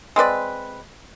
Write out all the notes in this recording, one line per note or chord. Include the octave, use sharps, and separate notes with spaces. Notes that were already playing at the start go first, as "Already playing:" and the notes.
G#3 C4 B4 D5